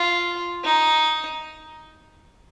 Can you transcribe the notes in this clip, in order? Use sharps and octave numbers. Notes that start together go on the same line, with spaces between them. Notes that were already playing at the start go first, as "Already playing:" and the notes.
Already playing: F4
D#4